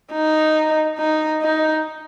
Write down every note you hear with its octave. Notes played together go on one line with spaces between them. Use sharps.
D#4
D#4
D#4